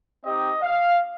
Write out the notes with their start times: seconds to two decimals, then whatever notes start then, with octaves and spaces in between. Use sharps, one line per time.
0.24 C4 D#4 G4 D#5
0.62 F5